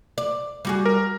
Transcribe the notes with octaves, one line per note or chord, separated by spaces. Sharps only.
D5
G3 F#4 G#4
A#4